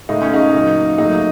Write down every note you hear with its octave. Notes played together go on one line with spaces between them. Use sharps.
A2 A3 D#4
C#4
D#4
A#2 F#3 A#3
A2 F#3 A#3 D#4